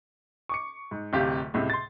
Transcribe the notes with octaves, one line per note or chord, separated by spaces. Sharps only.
C#6 D6 C#7
G#2
D1 C3 G4 F5
C#2 A2 C3
C6 A6